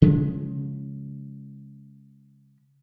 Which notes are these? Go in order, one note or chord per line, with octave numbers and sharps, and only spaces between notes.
C#3 F3 G#3 C#4